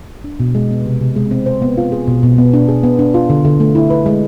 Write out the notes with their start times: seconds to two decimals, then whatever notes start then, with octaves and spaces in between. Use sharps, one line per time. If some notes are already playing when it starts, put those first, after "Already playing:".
0.24 D4
0.40 B2
0.55 G#3
0.70 B3
0.86 C3
1.01 C3
1.16 G#3
1.31 C4
1.46 C5
1.62 B3
1.77 F4
1.92 G#4
2.08 B2
2.23 B2
2.38 B3
2.54 D4
2.68 G#4
2.83 B3
2.99 D4
3.14 F4
3.30 D3
3.45 D3
3.60 A3
3.75 E4
3.90 B4
4.06 G#3